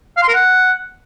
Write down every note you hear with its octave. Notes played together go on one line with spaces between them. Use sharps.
F5
C6
A#4
F#5